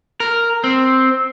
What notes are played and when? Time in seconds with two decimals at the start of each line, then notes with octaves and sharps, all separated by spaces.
0.20 A#4
0.64 C4